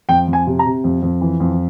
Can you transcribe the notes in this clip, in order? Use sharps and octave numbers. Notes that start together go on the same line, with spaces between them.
F2 G5
F2
G#5
C3
A#5
C3
F2
F2
E3
F2